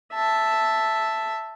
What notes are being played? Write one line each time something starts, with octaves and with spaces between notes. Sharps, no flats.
E5 A5